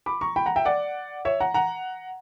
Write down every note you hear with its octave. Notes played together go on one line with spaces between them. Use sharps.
B5 D6
A#5 C#6
G5 B5
F#5 A#5
E5 G5
D5 F#5
C#5 E5
F#5 A#5
F#5 A#5